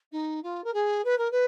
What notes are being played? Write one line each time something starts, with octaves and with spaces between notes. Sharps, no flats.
D#4
F4
A#4
G#4
B4
A#4
B4